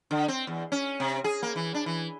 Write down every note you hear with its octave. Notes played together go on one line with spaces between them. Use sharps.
D3
C4
E2
C#4
C3
G#4
A#3
E3
D4
E3